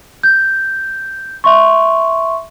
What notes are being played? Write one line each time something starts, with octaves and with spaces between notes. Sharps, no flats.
G6
E5 C6 C#6